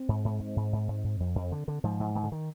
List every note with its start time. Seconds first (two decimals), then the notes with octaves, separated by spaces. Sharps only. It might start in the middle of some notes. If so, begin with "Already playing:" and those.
Already playing: C4
0.09 G#2
0.25 G#2
0.40 G#2
0.56 G#2
0.73 G#2
0.88 G#2
1.04 G#2
1.20 F2
1.36 F2
1.52 D3
1.68 D3
1.84 G#2 F3
2.00 G#2
2.15 G#2 D#3
2.23 D3
2.32 D#3